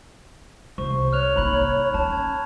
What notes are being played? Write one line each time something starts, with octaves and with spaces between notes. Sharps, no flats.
C2 C5 C#6
C#5 F6 F#6 F7
A#3 D#4 A#5 B5 F#6
C#4 A5
G#6